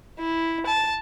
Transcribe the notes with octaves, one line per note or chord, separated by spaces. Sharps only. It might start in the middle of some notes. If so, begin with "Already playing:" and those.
E4
A5